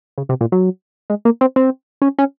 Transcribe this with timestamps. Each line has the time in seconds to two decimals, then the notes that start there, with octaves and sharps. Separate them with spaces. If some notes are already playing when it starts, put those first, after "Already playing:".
0.18 C#3
0.29 C3
0.41 A#2
0.52 F#3
1.10 G#3
1.25 A#3
1.41 C4
1.56 C4
2.02 C#4
2.19 C#4